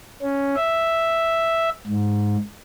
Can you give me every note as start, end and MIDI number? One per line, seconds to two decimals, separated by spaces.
0.22 0.55 61
0.55 1.69 76
1.87 2.37 44